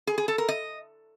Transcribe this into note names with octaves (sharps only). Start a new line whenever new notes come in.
G#4
G#4
A4
A#4
D#5